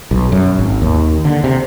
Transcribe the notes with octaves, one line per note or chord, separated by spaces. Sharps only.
B1
F#2
G#1
D#2
D3
C3